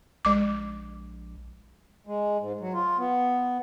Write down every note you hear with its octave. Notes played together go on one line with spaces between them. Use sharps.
A#1 G#3 D6
G#3
G#2
F#3
F4
B3